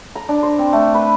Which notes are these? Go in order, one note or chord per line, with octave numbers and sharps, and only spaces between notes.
A#5
D4
C5
C4
A3
B4